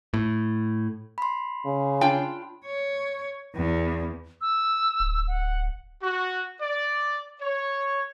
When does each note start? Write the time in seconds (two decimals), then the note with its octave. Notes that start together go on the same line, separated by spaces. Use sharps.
0.14 A2
1.18 B5 C6
1.65 C#3
2.01 D4 F4 G5
2.66 C#5
3.56 E2
4.41 E6
5.00 D1
5.28 F#5
6.02 F#4
6.60 D5
7.41 C#5